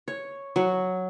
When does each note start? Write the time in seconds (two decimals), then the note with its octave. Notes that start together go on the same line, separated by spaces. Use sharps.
0.08 C#5
0.56 F#3